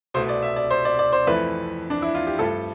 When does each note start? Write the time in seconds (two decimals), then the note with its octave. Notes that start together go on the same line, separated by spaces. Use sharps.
0.14 C2 B2 A3 C5
0.29 D5
0.42 E5
0.56 D5
0.71 C5
0.85 D5
0.99 D5
1.13 C5
1.27 F2 E3 A3 B4
1.90 D4
2.02 E4
2.15 F4
2.27 G4
2.39 G2 F3 A3 A4